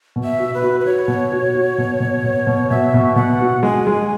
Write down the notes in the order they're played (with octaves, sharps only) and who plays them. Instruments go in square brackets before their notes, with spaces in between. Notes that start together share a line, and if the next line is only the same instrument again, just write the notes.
[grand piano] B2
[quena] E5
[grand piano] F#4
[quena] B4
[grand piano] F#4
[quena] B4
[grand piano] F#4 [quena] C#5
[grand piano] B2
F#4
F#4
B2
B2
B2
B2
[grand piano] B2 [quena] E5
[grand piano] B2
[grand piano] B2 [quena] F#5
[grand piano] F#4
[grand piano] G#3 [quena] G#5
[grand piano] G#3